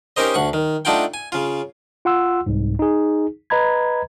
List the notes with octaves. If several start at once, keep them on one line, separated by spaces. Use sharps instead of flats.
C#4 D#4 G4 A#4 C5 D#5
D2 F#5 C#6
D#3
A3 D4 D#4 F4 F#5 G5
G#5
C#3 F4
F4 F#5 C6 E6
C2 G#2
D#4 G#4
B4 D#5 A#5 B5 G#6